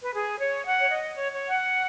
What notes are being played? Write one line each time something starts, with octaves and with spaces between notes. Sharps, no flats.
B4
G#4
C#5
F#5
C#5
D#5
C#5
C#5
F#5